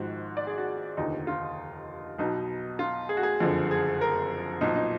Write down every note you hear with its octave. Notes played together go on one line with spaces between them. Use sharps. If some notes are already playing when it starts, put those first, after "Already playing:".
Already playing: G#1 G#2 F3 F#4
D5
G#4
F#4
F1 D#2 D3 F3 D#4
F4
B1 B2 D#4
F4
G#4
F#4
G#4
F#1 F2 D3 F3
G#4
A#4
B1 A#2 F3 D#4
D#4